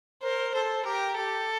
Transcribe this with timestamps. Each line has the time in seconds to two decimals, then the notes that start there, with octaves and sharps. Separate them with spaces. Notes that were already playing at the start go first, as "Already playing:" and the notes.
0.23 A#4 C5
0.54 A4 C5
0.85 G4 A#4
1.17 G4 A4